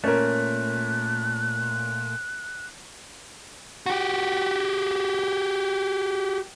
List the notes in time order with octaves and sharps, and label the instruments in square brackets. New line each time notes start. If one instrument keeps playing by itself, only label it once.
[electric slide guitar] A#2 A3 [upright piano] C#4 A#4 [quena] F#6
[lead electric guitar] F#4 G4